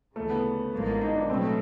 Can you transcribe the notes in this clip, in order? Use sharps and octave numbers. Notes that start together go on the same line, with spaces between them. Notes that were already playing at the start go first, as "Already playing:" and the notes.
D2 C#3 E3 A3
B3
A1 G#2 F3 A#3
D#4
D4
B2 F#3 A3 C4